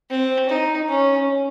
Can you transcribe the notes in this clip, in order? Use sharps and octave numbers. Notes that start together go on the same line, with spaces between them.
C4
D#4
C#4